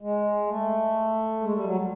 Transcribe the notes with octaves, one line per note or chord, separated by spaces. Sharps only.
G#3
A3
G#3
G3
F#3
G3